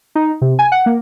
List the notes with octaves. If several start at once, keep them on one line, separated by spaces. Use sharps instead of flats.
D#4
C3
G#5
F#5
A#3